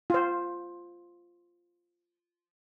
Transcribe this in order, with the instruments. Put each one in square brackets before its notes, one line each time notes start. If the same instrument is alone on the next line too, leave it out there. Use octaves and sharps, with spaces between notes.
[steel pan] F4 C5